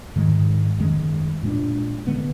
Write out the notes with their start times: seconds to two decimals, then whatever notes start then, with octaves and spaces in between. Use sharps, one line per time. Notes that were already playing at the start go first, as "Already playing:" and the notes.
0.16 G#2 D#3 G#3
0.79 F#2 D#3 G#3
1.43 A#2 G#3 B3 D4
2.07 D3 G#3 B3